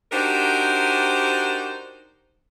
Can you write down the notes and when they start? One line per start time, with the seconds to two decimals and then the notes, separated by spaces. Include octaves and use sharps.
0.12 D4 D#4 F#4 G4 A#4 C5